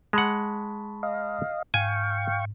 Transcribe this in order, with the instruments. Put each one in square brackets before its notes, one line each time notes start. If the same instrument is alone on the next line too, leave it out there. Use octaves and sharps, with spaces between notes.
[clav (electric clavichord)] G#3 F#5 [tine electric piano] A5 B5 C#6
[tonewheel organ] D#5 F5
[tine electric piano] G#2 [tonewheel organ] F5 G5 C#6 [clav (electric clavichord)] G#5